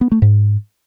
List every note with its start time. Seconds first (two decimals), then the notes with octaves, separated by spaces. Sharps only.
0.01 B3
0.12 A3
0.22 G#2